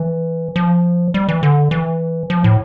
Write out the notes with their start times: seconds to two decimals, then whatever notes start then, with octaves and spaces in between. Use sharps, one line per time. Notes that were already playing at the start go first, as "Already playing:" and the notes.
Already playing: E3
0.56 F3
1.14 G3
1.28 E3
1.43 D3
1.71 E3
2.30 F3
2.44 A2